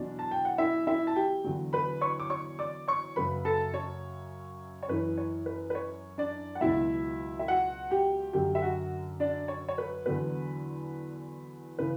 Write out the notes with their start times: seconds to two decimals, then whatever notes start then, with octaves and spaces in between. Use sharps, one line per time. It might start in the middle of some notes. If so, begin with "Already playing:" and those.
Already playing: E2 B2 F#3 D4
0.19 A5
0.31 G5
0.45 F#5
0.58 E4 E5
0.87 E4 E5
1.07 A5
1.16 G4 G5
1.44 E2 D3 F#3
1.73 B4 B5
2.01 C#5 C#6
2.20 D6
2.30 C#5 C#6
2.59 D5 D6
2.88 C#5 C#6
3.16 F#2 C#3 F#3 B4 B5
3.45 A4 A5
3.74 C#5
4.83 C#5
4.88 F#2 E3 B4
5.17 C#5
5.46 B4
5.70 B4
5.75 C#5
6.18 D4 D5
6.55 F#5
6.61 C#2 B2 F#3 E4 E5
7.39 E5
7.48 F#4 F#5
7.91 G4 G5
8.33 F#2 D3 F#3 G4 G5
8.55 E5
8.62 F#4 F#5
9.20 D4 D5
9.48 C#5
9.68 C#5
9.78 B4
10.06 E2 D3 F#3 B4
11.79 C#3 E3 B4